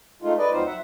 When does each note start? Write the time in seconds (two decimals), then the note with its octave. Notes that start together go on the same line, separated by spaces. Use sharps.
0.22 G#3 A3 D#4 F4
0.38 B4 D5 D#5
0.51 D2 F#3 C4 D#4 F4 C5
0.66 E5 F#5